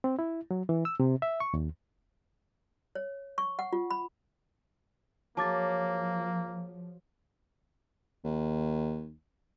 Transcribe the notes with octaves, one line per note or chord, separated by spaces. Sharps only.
C4
E4
F#3
E3
E6
C3
E5
C#6
D#2
C#5
C#6
F#5
F4
B5
F3 F#3 A#3 G#4 A5 D6 A6
D#2